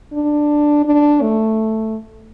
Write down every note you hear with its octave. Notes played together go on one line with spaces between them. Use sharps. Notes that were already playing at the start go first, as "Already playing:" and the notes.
D4
D4
A3